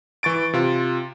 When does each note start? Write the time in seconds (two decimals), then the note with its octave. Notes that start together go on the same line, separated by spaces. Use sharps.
0.23 E3 C#6 A6 D7
0.53 C3 F4